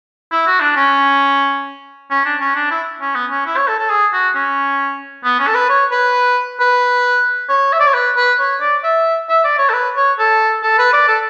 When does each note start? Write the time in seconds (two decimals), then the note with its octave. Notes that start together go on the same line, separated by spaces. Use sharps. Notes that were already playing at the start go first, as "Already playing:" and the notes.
0.32 E4
0.47 F#4
0.61 D4
0.76 C#4
2.11 C#4
2.25 D4
2.41 C#4
2.56 D4
2.71 E4
3.01 C#4
3.15 B3
3.31 C#4
3.46 E4
3.57 C#5
3.68 A4
3.79 A4
3.90 G#4
4.13 F#4
4.35 C#4
5.24 B3
5.40 C#4
5.47 A4
5.54 B4
5.70 C#5
5.92 B4
6.60 B4
7.49 C#5
7.73 E5
7.80 D5
7.88 C#5
7.94 B4
8.17 B4
8.39 C#5
8.61 D5
8.84 E5
9.29 E5
9.44 D5
9.58 C#5
9.70 A4
9.73 B4
9.97 C#5
10.19 A4
10.63 A4
10.79 B4
10.93 D5
11.08 A4